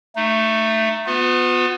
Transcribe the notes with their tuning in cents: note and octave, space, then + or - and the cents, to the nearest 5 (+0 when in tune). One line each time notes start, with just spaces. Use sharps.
A3 +10 D#4 -15
B3 +0 F4 +45 B4 +40